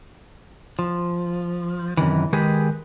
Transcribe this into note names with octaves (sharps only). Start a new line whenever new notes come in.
F3
F#2 C3 D#3 E3
D#3 G#3 G4 G#4 B4